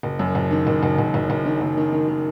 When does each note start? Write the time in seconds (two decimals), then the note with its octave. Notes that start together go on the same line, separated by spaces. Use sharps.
0.03 F#1
0.19 F#2
0.35 F#1
0.51 D#3
0.67 F#1
0.83 F#1
0.98 F#1
1.14 F#1
1.30 F#1
1.46 D#3
1.61 F#1
1.77 D#3
1.93 D#3
2.08 D#3